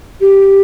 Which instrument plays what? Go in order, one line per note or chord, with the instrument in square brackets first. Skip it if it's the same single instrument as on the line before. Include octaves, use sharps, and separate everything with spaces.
[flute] G4